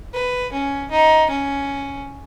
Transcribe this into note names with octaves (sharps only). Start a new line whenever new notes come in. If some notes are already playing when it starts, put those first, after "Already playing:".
B4
C#4
D#4
C#4